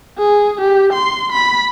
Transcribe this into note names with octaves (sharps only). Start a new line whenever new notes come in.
G#4
G4
C6
B5